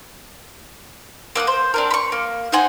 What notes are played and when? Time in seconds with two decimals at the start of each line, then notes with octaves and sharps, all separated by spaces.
1.36 A#3 E5 F#5 D#6
1.47 C5
1.74 C4 D4 A#4
1.91 B5 C#6
2.12 A#3
2.52 D#4 C5 F#5 G#5